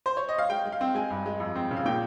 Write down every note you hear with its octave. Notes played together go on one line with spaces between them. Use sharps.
C5
C#5
D#5
F5
G#3 G5
G#3
F5
C4
G#3 G#5
G2
G#3
F2
C4
C#3
F5
A#2 G5